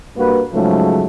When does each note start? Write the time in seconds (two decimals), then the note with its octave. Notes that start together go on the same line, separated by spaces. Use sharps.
0.17 G2 A#3 F#4 B4
0.53 G#2 C#3 F3 F#3 A3